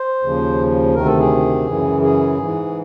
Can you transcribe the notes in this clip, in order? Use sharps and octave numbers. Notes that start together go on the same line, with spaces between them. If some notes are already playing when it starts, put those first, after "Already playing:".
Already playing: C5
D#2 C#3 F3
D2 C3 D#3 A#4
A4
G#4
F#2 C#3 E3
G#4
G#2 E3